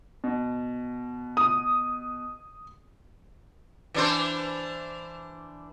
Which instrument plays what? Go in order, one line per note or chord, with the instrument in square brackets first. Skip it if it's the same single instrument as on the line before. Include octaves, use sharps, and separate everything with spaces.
[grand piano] B2
[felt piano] D#6
[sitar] E3 D4 C5